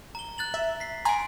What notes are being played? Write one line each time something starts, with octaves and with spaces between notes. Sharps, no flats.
A#5 G7
F#6 A6 F#7
E5
B6 C7
G#5 A#5 C6 D7